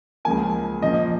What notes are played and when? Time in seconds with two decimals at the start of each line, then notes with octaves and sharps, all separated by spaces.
0.25 C#2 C#3 F3 A#3 G#5
0.81 A#2 F3 C#4 D#5